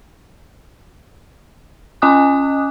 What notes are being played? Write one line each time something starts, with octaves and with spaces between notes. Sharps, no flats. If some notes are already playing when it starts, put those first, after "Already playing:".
C#4 D#5 G#5 D6 D#6 F#6